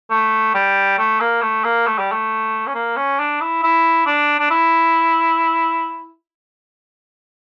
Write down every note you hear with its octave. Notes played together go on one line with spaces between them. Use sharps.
A3
G3
A3
A#3
A3
A#3
A3
G3
A3
C#4
A#3
C#4
D4
E4
E4
D4
D4
E4